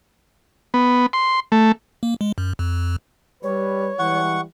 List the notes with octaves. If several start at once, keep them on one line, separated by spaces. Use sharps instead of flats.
B3
C6
A3
A#3
G#3
F#2
F2
G3 B4 C#5
E3 G3 G#3 F#5 C#6